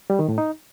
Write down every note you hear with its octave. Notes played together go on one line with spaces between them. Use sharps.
G3
D#3
A2
D#4